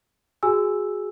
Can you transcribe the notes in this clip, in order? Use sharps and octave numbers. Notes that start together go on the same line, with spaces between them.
F#4 G#4 G#5 E6